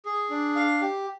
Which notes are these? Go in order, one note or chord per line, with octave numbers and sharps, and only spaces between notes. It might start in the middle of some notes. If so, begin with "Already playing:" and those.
G#4
D4
F5
G4